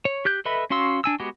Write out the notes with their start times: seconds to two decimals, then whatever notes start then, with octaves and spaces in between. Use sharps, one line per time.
0.05 C#5
0.25 G4 F#6 G6
0.45 A4 B4 D#5 E5 B5
0.70 C#4 F#4 F5 C6 E6
1.04 D4 G#5 E6
1.20 G#3 B3 F#4 G4